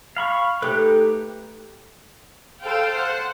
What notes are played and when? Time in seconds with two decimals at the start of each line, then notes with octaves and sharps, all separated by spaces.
0.16 F5 B5 C#6
0.62 A3 D#4 G4 B4
2.61 A4 C5 F5 G5
2.91 C5 F#5